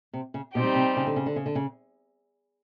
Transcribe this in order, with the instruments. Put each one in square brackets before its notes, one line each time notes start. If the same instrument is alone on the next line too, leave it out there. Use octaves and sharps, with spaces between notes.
[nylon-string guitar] C3
C#3
[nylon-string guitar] B2 [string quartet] G3 C4 D#4 G4
[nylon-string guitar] C3
C#3
D3
C#3
D3
C#3
D3
C#3